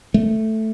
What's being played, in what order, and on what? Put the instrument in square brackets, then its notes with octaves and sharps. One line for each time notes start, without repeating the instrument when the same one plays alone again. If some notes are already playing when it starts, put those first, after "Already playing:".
[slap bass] A3